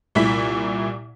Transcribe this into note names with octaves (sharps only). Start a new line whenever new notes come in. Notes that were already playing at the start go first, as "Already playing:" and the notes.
C2 A#2 E4 B6